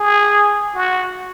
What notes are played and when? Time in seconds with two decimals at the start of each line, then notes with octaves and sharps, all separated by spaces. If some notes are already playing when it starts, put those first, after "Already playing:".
Already playing: G#4
0.75 F#4